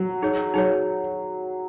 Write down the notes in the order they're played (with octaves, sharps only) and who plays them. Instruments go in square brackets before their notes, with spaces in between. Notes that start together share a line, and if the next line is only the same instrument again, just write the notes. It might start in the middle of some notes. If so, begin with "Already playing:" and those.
Already playing: [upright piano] F#3
[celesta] D#4 G#4 C#5
[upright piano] F#3 [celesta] D#4 G#4 C#5